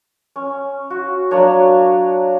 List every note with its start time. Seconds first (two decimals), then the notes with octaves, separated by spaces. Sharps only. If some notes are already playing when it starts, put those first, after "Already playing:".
0.36 C#4
0.90 F#4
1.31 F#3 A#3 D4 C#5